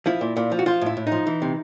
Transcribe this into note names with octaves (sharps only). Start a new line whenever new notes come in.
F3 E4
A#2
A#2
F3
F#4
F3 F4
A2 E4
A2
D#4
F3
E3
C3